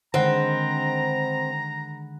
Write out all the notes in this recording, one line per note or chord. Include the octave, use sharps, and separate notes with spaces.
D3 D#3 G#3 C4 F#5 A#5 B5